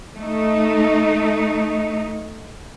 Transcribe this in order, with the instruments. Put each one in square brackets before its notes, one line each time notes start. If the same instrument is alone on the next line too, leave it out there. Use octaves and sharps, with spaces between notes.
[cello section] A3 D#4